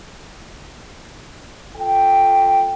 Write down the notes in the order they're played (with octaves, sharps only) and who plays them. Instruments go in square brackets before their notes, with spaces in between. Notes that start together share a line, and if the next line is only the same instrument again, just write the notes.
[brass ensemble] F4 A4 G5